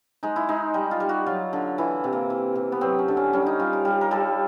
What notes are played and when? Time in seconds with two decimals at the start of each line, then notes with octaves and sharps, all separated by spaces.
0.23 G#3 D#4
0.36 E4
0.49 G#3 D#4
0.74 G3
0.91 F4
1.00 G3
1.09 F#4
1.26 F#3 F4
1.53 D3
1.78 E3 E4
2.04 C3
2.13 A#3
2.30 E3
2.55 C3
2.72 B3
2.81 F#3 C4
2.99 C#4
3.08 D3
3.17 C#4
3.33 G3 C#4
3.46 D#4
3.59 G3 F4
3.73 A#4
3.85 G3
4.01 A#4
4.11 G3 A4